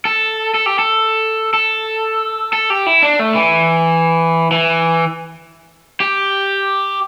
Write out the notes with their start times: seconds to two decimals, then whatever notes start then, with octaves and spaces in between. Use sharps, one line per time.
0.05 A4
0.54 A4
0.66 G4
0.79 A4
1.54 A4
2.53 A4
2.70 G4
2.87 E4
3.03 D4
3.19 A3
3.35 E3
4.51 E3
6.00 G4